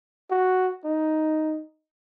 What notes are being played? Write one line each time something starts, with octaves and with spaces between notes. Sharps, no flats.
F#4
D#4